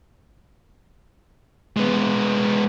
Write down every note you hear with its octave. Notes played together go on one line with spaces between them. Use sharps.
G#3 B3